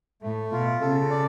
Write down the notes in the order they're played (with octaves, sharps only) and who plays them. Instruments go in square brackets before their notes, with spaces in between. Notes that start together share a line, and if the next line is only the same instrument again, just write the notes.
[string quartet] A2 [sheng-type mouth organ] A3
[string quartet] B2 [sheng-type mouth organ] F4
[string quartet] C#3 [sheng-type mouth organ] A4
[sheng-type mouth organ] D5